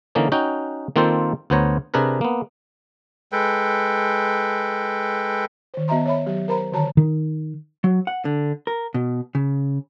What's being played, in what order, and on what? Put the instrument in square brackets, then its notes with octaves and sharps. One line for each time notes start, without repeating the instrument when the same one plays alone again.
[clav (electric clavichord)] D3 E3 A#3 C#4 D#4
C#4 D#4 F#4 G5
D#3 A#3 C4 F4 A4 C5
D2 B3 C5 C#5 A#5
C3 D4 G#4 A#4 B4
A#3 B3
[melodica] G#3 A4 B4 G5
[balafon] D#3 C5
B3 F#4 D#5 E5 A#5 C6
C#5 E5 B5
F#3 G4
A#4 C5 A#5 B5
D3 D#3 F#4 C#5 A5 A#5
[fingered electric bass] D#3
[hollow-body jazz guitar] F#3
F#5
D3
A#4
B2
C#3